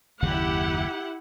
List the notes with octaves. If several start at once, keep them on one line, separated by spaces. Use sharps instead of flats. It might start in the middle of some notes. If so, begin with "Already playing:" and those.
F#1 D#2 C#3 E4 G4 F#5